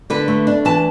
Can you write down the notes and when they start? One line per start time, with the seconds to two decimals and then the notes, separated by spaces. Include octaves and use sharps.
0.10 D3 B4
0.28 A3
0.47 D4
0.65 E3 A5